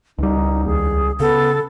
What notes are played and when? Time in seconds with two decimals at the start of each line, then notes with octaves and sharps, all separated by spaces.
0.19 C#2 G3 D#4
0.66 D#2 G#4
1.20 C#3 B3 A4